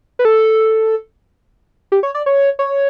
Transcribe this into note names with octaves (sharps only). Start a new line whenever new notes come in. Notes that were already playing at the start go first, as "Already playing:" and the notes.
B4
A4
G4
C#5
D5
C#5
C#5